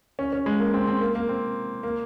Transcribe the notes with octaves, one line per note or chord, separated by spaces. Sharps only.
C#4
C#4
G#3
A#3
C4
C4
A#3
A#3
C4
A#3